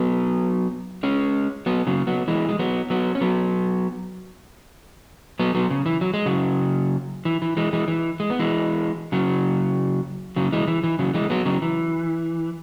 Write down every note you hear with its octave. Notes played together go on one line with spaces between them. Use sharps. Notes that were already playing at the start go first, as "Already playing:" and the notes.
Already playing: F#3 B3
G#3 C#4
F#3 B3
C#3 F#3
F#3 B3
E3 G#3
G#3
F#3 B3
F#3 B3
C#4
F#3 B3
F#3 B3
F#3 B3
C#3
E3
F#3
G#3
C#3 F#3
E3
E3
E3 G#3
E3 G#3
E3
G#3
B3
E3 G#3
C#3 F#3
C#3 F#3
E3 G#3
E3
E3
C#3 F#3
E3 G#3
F#3 B3
C#3 F#3
E3